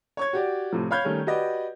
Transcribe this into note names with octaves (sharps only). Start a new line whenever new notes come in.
C#5 C#6 G#6
F#4 G4 D5
A2 C3 F3
C#5 F5 B5 F6 G6 G#6
D#3 G3 A3 C#4
F#4 G4 B4 D5 D#5